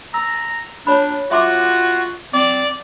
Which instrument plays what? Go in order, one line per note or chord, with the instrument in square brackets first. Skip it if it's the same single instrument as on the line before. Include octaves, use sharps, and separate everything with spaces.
[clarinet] A#5 [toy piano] E6
[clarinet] D4 [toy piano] C#5 B5
[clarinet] F4 [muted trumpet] F#4 [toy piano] E5 C6 D6
[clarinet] C4 [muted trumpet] D5